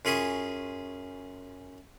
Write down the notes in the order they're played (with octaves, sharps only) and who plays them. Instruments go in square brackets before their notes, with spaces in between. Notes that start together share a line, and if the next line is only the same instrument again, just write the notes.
[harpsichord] F#2 F4 G#4 B5 C#6 D#6